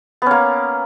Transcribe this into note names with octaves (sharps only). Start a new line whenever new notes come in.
A#3 B3 C#4